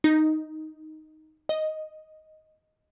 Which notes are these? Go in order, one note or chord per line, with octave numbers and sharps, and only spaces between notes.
D#4
D#5